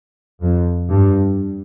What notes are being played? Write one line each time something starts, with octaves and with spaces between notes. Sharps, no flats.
F2
G2